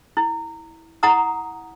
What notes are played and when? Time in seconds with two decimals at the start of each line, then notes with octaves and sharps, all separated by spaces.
0.17 E4
1.03 E4 F#5 A#5 D#6